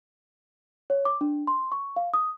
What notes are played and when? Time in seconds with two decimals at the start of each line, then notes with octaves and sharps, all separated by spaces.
0.90 C#5
1.05 D6
1.21 D4
1.47 C6
1.72 C#6
1.96 F5
2.14 D#6